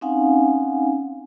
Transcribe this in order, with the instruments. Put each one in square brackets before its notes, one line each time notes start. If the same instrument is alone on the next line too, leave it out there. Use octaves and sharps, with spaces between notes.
[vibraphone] C4 C#4 D#4 F5 F#5 G#5